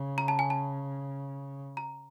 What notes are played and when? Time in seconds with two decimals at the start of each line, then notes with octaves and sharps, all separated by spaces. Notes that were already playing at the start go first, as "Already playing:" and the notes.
Already playing: C#3
0.18 A#5
0.28 A5
0.39 G#5
0.50 A5
1.77 A#5